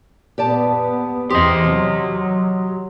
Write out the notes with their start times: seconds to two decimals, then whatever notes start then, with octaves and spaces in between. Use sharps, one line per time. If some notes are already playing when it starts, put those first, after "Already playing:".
0.38 A#2 B3 G4 D5 A5
1.31 E2 C4 G4 D#5 C6 D#6
1.64 C3 F#3